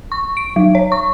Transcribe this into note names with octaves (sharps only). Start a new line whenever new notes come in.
C#6
D7
F#3
C#5
C#6